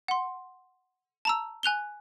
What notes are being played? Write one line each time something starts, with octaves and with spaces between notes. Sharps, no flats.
F#5 C6
A5 A#5 E6
G#5 F#6 F7 G7